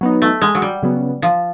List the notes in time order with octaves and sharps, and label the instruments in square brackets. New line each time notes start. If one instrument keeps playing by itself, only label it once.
[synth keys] F#3 B3 D#4
[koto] A3
G#3
F#3
G3
[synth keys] C#3 F#3 B3
[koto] F3